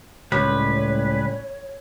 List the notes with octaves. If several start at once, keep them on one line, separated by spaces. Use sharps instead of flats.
C#2 A2 G3 C#4 B4 C#5